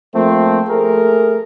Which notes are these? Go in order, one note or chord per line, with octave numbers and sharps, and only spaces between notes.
F3 A3 A#3 C4
A3 G#4 A#4